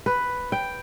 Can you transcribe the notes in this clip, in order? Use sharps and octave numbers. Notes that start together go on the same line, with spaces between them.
B4
G5